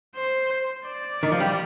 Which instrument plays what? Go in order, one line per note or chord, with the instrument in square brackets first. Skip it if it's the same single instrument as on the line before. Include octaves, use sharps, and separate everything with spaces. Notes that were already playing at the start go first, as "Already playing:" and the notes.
[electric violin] C5
D5
[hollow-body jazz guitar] D#3
F3
G3